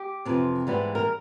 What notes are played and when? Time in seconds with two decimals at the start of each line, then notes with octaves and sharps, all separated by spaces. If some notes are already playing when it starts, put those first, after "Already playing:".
Already playing: G4
0.25 F2 C3 E3
0.67 G#2 E3 G3 B3
0.95 A#4